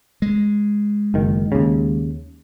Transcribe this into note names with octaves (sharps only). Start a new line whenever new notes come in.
G#3
F#1 D#3
D#2 C#3